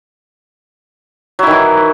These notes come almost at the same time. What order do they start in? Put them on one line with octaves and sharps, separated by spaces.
F#3 E4 D#3 E3